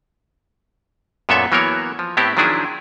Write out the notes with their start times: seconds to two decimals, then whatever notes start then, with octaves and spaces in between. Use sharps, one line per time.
1.29 F#2 A#2 B3 A4 C#5 E5
1.52 E3 F#3 A#3 B3 A#4 C#5
1.99 F3
2.17 A2 B3 C4 E4 G4
2.37 D#3 F3 F#3 D4 E4 G#4